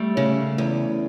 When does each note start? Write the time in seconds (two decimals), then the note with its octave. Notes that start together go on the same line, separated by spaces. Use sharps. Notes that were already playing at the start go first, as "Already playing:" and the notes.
Already playing: G3 A3
0.17 C#3
0.58 E2